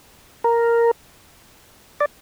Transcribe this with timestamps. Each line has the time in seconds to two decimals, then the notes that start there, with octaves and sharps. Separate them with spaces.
0.44 A#4
2.00 D5